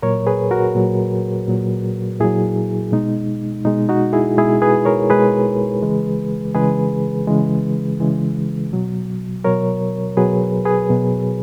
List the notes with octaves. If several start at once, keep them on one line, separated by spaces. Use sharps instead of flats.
A#2 F#3 A#4 C#5
G#4 B4
F#4 A#4
A#2 F#3
A#2 F#3
A#2 F#3 E4 G#4
B2 G#3 D#4
B2 G#3 D#4
D#4 F#4
E4 G#4
B2 G#3 E4 G#4
G#4 B4
A#4 C#5
B2 G#3 G#4 B4
C#3 E3 G#3
C#3 E3 G#3 G#4 B4
C#3 E3 G#3
C#3 E3 G#3
B2 F#3
B2 F#3 A#4 C#5
B2 F#3 G#4 B4
G#4 B4
B2 F#3